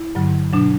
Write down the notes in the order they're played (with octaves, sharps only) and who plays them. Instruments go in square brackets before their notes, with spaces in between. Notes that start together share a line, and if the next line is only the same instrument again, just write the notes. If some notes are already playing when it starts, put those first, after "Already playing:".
Already playing: [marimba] E4
G2 D3 F#3
B2 F#3 D4